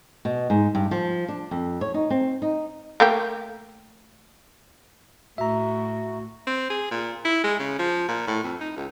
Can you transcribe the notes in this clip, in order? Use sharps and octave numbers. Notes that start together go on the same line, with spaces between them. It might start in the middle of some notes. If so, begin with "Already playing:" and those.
B2
G#2
G2
F3
D4
F2
C#5
D#4
C4
D#4
A3 A#3 G4
A2 F#4 E5 A#5
C4
G#4
A#2
E4
G#3
C#3
F3
A#2
A2
F2
D#4
C#2